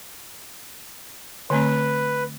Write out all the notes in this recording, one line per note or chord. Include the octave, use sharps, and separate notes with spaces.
D3 A3 C4 B4